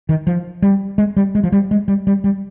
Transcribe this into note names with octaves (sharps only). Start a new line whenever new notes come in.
D#3
F3
G3
G#3
G3
G#3
F3
G3
G#3
G3
G3
G3